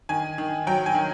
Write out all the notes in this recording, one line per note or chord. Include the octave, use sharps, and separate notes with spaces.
D#3 G#5
D#3
F#3 G5
G#5
D#3